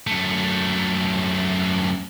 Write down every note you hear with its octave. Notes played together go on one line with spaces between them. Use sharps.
F#2 A3